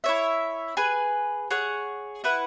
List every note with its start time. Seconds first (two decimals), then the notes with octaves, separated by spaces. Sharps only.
0.04 E4 C#5 E5
0.77 G#4 B4 G#5
1.51 G#4 C#5 F#5
2.24 E4 B4 F#5